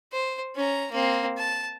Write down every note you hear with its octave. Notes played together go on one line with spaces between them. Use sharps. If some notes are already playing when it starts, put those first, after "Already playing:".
C5
C#4 A#5
A#3 C4
A5